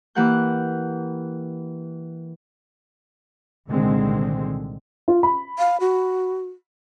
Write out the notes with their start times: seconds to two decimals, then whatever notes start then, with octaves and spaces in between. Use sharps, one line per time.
0.15 E3 A#3 G4 F#5 F#6 G6
3.69 C2 A#2 D3 D#3 G#3 C4
5.08 F4
5.23 B5
5.59 F5
5.80 F#4